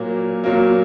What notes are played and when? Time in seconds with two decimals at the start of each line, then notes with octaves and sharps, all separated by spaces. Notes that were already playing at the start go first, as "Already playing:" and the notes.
Already playing: A#2 F#3 A#3
0.44 A#2 F#3 A#3